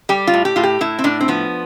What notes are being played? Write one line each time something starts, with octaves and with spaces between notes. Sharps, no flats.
G3 G4
F4
A2
G4
A2 F4
G4
A2 E4
C4
A2 D4
C4
F3 B3